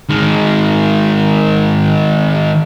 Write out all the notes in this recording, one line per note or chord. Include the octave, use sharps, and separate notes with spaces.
D#3 G#3